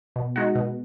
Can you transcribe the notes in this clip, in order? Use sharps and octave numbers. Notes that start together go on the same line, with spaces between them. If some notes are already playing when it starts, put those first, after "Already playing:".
B2
G#3 D#4 F#4
B2